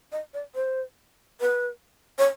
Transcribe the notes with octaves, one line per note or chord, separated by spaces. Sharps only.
D#5
D5
C5
B4
C#5